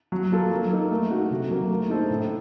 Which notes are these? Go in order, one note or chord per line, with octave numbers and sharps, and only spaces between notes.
F#3
A#3 F4 A4
F#3
A#3 D#4
A3
D#4 F#4 A4
C3
F#3 A#3
A3
D#4 A4 C5
A2